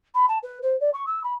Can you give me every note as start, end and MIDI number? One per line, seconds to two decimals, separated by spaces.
0.14 0.25 83
0.28 0.38 81
0.43 0.59 71
0.62 0.78 72
0.80 0.90 74
0.93 1.04 85
1.06 1.22 88
1.23 1.34 83